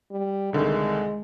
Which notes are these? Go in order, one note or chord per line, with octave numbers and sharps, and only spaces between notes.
G3
C2 D3 D#3 G#3